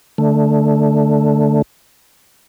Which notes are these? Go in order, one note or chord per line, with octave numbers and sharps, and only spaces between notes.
D3 A3